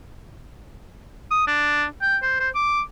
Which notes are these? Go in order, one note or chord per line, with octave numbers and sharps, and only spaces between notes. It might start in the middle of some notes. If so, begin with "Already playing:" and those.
D#6
D4
G5
C5
C5
D6